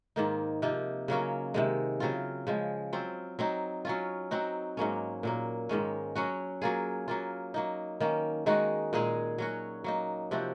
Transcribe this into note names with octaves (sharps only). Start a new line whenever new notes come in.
G#2 D#3 A#3 D#4
C3 F3 A#3 D#4
C#3 F#3 A#3 C#4
C3 D#3 G#3
C#3 F#3 C4 F4
C#3 F3 G#3
F#3 C4 F4
F#3 C4 D#4
F#3 C#4 F4
F#3 C4 D#4 F#4
G#2 F#3 A#3 C#4
A#2 F#3 A#3
G#2 D#3 G#3 C#4
F#3 C#4 F#4
F#3 A#3 F4 G#4
F#3 A#3 F4
F#3 A#3 D#4
D#3 A#3 C#4
D#3 G#3 D#4 F#4
A#2 G#3 D#4 G#4
F#3 C#4 F#4
F#3 A#3 D#4
C3 F3 C4 F#4